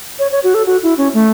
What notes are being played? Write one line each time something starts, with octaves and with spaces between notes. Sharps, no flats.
C#5
C#5
F#4
A4
F#4
E4
C#4
A3